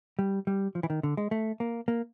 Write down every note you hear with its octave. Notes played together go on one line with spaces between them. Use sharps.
G3
G3
F3
E3
D#3
D3
G#3
A3
A#3
A#3